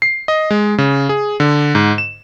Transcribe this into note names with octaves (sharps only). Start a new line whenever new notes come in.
C7
D#5
G#3
C#3
G#4
D3
G#2
E7